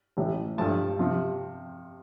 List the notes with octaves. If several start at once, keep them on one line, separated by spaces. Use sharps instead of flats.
A1 A2 E3
G2 F3 A3 A5
C3 F3